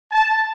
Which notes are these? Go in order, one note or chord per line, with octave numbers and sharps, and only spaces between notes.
A5